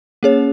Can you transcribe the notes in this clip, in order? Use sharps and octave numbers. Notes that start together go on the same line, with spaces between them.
A#3 C#4 G#4 C#5